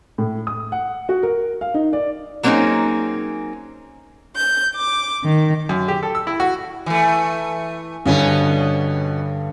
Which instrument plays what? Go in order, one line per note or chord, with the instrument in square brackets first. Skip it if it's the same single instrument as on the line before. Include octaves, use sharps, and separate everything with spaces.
[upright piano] A2
D#6
F#5
F#4
A#4
F5
D#4
D5
[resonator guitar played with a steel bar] F#3 A#3 C4 C#4 D#4 G#4
[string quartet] G6
D6
D#3
[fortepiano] F#2
G4
A4
E6
E4
F#4
[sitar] E3 A3
[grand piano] G2 D3 [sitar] B2 B3 C#4